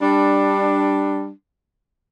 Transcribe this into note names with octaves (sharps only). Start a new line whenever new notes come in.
G3 D4